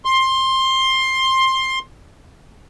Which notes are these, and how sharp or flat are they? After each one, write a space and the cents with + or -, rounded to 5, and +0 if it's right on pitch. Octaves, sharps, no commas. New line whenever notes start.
C6 +15